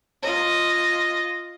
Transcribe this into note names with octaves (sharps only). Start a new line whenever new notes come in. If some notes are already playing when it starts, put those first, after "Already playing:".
F4 D#5